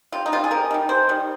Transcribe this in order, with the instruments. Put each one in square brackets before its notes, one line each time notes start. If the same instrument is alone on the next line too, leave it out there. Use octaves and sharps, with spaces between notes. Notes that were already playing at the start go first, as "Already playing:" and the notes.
[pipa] C3 F4
D#4
D#3 G3 F4
G#4
C3 A#4
D#3 G3
C3 C5
D#3 G3